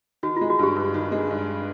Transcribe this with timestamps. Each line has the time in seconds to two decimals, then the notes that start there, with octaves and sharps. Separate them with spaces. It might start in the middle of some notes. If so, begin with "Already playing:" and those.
0.23 D#3 F#4
0.37 G#3 F4
0.50 F#4
0.59 G2 G4
0.76 G2
0.94 D#3
1.12 G#3
1.30 G2